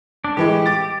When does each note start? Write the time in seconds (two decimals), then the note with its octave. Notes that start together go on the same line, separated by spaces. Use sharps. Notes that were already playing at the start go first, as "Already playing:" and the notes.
0.24 D4
0.37 A2 E3 G#3 G4
0.66 D6 A6